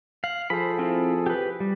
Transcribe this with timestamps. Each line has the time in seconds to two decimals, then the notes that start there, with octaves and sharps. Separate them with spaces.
0.24 F5 F#6
0.50 F3 G#4 A4 C5 B5
0.79 C4 E4 F4
1.26 G4 B4
1.60 G3